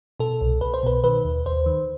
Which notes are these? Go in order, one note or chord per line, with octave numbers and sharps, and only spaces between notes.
B2 A4
C2
C2 B4
C5
B2 B4
D#3 B4
D#2
D#2 C5
D#3